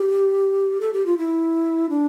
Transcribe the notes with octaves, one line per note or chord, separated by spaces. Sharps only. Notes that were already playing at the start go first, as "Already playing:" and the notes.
Already playing: G4
A4
G4
F4
E4
D4